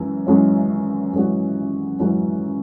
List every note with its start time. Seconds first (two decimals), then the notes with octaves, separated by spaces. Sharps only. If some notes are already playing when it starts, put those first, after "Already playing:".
Already playing: F#2 E3 G#3
0.27 F#2 E3 G#3 C#4 F#4
1.13 F#2 E3 G#3 C#4 F#4
1.99 F#2 E3 G#3 C#4 F#4